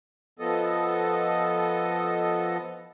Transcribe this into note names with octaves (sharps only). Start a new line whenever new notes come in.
F3 B3 A4 D#5